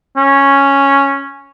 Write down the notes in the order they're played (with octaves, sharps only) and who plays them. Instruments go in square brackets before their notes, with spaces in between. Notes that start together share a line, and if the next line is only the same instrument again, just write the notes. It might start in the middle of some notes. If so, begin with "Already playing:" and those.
[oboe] C#4